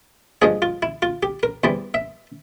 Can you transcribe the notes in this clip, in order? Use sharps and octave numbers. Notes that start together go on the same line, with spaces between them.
G2 F3 G#3 G#4
F4
E4
F4
G4
A#4
E2 E3 G3 C5
E5